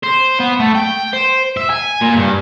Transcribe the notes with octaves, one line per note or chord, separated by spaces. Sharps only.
C5
B3
A3
G5
C5
E5
G#5
A#2
G2